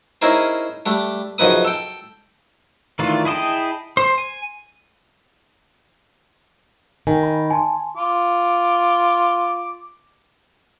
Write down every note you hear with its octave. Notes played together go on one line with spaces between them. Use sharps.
C#4 D#4 E4 G#4 A#4 C5
G3 A3 D4
F#2 C#3 F3 D#4 B4 D#6
A4 G5
D#3 E3 A3 D4 F4
E4 G#4 D#5 G5 A5
C5
G#5
D#3 G#5
B5
G#5 A5 C6
F4 D6